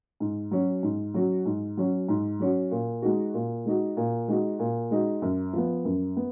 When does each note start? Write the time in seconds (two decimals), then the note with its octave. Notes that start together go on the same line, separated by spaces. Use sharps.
0.20 G#2
0.51 F#3 C#4 F#4
0.83 G#2
1.14 F#3 C#4 F#4
1.46 G#2
1.77 F#3 C#4 F#4
2.08 G#2
2.39 F#3 C#4 F#4
2.71 A#2
3.02 G#3 D#4 F#4
3.34 A#2
3.65 G#3 D#4 F#4
3.97 A#2
4.28 G#3 D#4 F#4
4.59 A#2
4.91 G#3 D#4 F#4
5.22 F#2
5.53 F3 B3
5.85 F#2
6.17 B3